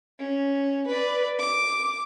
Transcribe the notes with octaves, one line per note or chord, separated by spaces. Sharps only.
C#4
B4 D5
D6